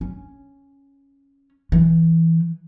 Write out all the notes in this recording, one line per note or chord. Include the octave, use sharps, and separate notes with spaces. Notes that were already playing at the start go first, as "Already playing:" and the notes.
C#4
E3